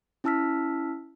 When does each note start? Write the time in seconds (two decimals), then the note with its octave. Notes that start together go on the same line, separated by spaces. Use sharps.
0.24 C#4 E4 A5 E6 F6 B6